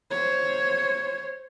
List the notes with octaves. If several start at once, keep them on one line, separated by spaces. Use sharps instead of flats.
C5 C#5